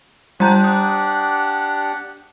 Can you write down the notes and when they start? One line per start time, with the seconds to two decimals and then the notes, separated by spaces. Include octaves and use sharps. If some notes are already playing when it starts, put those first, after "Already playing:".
0.40 G3 D4 G4 F#5 A#5 G6
0.64 D#6